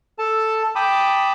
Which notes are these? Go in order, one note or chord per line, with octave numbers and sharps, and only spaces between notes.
A4 A5
G5 A5 B5 D6 D#6